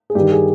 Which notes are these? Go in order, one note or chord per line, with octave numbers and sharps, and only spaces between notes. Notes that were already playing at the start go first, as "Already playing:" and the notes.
G#4
G2 D#3 G4
G#4